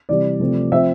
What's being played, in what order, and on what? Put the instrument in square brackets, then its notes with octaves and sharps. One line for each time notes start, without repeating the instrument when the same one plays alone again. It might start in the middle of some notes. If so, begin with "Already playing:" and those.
[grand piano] C3 E3 G3 D5
C3 F3 A3 C4
F3 C4 F4 E5